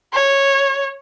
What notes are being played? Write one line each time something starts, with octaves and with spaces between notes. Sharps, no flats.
C#5